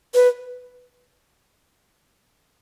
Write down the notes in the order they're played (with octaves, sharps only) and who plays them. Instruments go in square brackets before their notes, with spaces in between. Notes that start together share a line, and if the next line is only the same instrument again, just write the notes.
[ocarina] B4